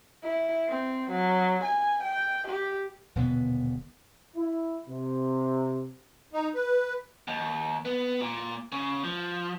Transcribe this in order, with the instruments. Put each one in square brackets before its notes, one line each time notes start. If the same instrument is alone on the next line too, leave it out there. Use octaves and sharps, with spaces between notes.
[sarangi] E4
C4
F#3
G#5
G5
G4
[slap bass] D#1 B2 D3 B3
[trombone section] E4
C3
[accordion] D#4
B4
[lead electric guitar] D#2
B3
A#2
C#3
F3